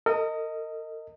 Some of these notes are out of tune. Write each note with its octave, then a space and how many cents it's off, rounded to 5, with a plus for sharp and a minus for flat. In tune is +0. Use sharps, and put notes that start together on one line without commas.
A#4 -40 D#5 +5